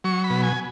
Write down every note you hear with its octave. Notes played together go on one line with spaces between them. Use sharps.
F#3 C#6
B5
B2
G#5